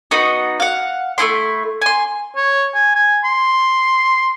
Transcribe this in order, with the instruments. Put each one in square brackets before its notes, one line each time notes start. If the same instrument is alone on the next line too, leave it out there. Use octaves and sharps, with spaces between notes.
[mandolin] B3 D#4 F#4
F5 F#5
A3 C4 E4 C6
G#5 C6
[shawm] C#5
G#5
G#5
C6